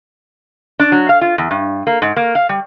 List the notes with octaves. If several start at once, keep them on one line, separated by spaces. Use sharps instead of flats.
D4
F#3
F5
F4
E2
G2
A#3
G#2
A#3
F5
G3